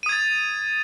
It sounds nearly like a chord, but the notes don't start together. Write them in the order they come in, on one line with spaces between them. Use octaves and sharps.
D#7 D#6 G#6 A6